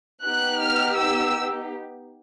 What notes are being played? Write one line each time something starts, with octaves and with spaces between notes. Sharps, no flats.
B3 D#4 G4 F#6
F6
E6